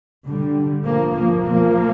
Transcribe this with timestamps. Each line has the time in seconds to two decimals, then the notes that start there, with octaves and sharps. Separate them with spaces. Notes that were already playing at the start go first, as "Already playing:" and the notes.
0.25 D3 G3
0.83 F3 A#3
1.13 F3 A#3
1.42 F3 A#3